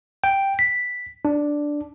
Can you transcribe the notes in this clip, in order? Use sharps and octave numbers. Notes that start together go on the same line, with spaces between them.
G5
B6
D4